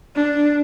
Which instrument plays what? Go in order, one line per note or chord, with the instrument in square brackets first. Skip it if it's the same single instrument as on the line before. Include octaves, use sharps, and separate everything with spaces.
[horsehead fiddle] D4